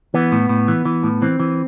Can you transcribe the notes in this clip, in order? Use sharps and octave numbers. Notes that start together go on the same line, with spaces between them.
E3 B3
A2
A2
E3
E3
A2
E3 C4
E3